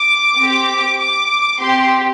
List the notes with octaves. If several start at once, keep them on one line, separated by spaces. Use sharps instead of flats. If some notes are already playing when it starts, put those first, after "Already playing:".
Already playing: D6
C4 G4
D6
C4 G4 C6